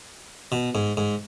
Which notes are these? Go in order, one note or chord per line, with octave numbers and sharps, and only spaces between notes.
B2
G#2
G#2